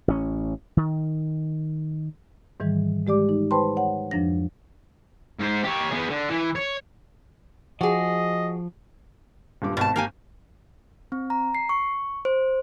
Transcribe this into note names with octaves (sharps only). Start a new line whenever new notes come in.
A1 C#4
D#3
G#2 D#3 E3 G3
G#3 G4 D5 D6
D#4
B4 C5 G5 A5 B5 C6
C#5 F#5
F2 F3 D4 A#6
G#2 C5
G4 C#5
B3 G#4
D3
E3
C#5
F3 F#4 G#4 D#5
D#1 G2 D6
G#1 B2 A5
A#3 G4 G#5
C4
A#5
C7
C#6
C5